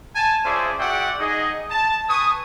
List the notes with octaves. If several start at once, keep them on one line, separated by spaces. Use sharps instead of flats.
G#5 A5
C#4 F4 G#4 C5 D5 E5
F#4 G#4 D5 E5 F#5 G5
D#4 G#4 D#5
A5
B4 G#5 C#6 D#6